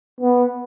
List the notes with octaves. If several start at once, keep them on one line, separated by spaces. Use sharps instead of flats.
B3